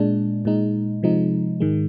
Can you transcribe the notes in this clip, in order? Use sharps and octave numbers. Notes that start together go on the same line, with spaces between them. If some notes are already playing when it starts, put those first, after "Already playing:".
Already playing: A#2 G#3 D4
A#2 G#3 D#4
C3 F3 G#3 D#4
G#2 D#3 G#3